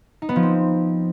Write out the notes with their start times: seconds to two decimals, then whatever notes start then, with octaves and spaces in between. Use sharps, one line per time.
0.22 D#4
0.29 B3
0.36 F3
0.43 C4